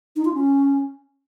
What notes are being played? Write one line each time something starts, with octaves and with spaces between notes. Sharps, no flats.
D#4
F4
C#4